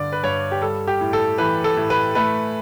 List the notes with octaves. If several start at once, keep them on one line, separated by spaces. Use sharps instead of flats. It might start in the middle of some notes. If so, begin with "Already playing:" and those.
Already playing: G2 D3 D5
B4
G2 C#5
G4
G3 A4
G4
A2
A4
E3 B4
A4
A2
B4
A3 B4